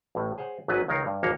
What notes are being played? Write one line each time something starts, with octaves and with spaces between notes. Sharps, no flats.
A1 A2
G#4 C5 C#5 F#5
G#1 F#2 F#3 B3 B4 G#5
C#2 D#3 A#4 C#5 F5
G2
G#1 D#2 A#3 C#5